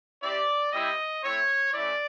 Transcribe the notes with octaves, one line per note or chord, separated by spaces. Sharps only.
C4 E4 G4 D5
G3 C4 E4 G4 D#5
A3 C4 E4 C#5
A3 C#4 E4 D5